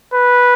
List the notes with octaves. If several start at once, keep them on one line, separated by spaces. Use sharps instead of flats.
B4